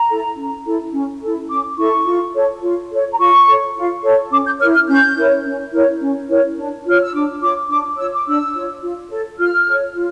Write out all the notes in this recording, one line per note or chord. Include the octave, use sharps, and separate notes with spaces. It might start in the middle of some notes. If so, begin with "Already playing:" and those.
Already playing: A#5
E4 A4
C#4
E4 A4
C#4
E4 A4
C#4 D6
E4 A4 C#6
F4
A4 C#5
F4
A4 C#5
A#5
F4 C#6
A4 C#5
F4
A4 C#5
C#4 D6
G6
E4 A#4 C#5 F6
F6
C#4 G6
E4 A#4 C#5
C#4
E4 A#4 C#5
C#4
E4 A#4 C#5
D4
F4 C#5 F6
E6
D4 D6
F4 C#5 D6
D4 D6
F4 C#5 E6
D6
D4 E6
F4 C#5
F4
A4 C#5
F4 F6
A4 C#5
F4